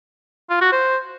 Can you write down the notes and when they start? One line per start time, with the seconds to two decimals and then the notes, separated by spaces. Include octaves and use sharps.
0.50 F4
0.61 F#4
0.72 C5